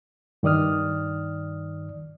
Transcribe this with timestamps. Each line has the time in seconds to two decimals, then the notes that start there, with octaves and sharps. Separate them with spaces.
0.43 G2 D#3 D5 D#6 F6